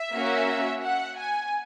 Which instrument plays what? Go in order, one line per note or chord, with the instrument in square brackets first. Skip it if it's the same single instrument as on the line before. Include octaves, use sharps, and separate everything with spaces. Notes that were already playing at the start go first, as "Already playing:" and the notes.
Already playing: [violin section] E5
A#3 C#4 F#4
F#5
G#5